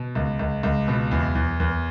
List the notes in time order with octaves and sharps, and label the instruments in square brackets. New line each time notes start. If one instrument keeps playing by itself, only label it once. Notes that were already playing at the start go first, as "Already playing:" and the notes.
Already playing: [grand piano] B2
C#2
C#2
C#2
B2
E2
E2
E2